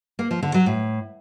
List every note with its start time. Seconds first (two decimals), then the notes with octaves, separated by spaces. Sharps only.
0.19 A#3
0.31 F3
0.43 D3
0.54 F#3
0.66 A2